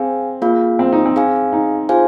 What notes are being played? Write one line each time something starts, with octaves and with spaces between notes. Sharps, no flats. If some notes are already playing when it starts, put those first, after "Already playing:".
Already playing: C4 G#4 F5 G#5
A#3 F4 G#4 F5
C4
D#4
C4
G#4 F5 G#5
D#4
F4 G#4 C5 F5 G#5